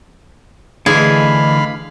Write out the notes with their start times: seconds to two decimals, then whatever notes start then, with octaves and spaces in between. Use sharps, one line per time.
0.86 D3 E3 A3 G#4 D#5 F5 B5